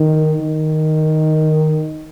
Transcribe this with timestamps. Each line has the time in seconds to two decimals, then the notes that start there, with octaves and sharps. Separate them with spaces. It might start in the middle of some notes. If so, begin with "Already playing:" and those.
Already playing: D#3
0.41 D#3